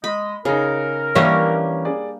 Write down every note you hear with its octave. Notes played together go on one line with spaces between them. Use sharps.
G#3 D#5 B5
C#3 D#4 G#4 A#4
E3 G3 A#3 C#4 D4 G4 E5
G#4 D5